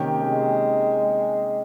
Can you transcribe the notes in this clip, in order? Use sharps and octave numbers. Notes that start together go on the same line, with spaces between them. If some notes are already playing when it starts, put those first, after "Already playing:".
Already playing: C3 D#3 A#3 C#4 G4
G#3